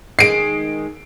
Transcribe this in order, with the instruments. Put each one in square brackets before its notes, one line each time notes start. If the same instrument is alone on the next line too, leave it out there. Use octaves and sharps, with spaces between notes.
[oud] D#3 G#3 [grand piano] C7 D7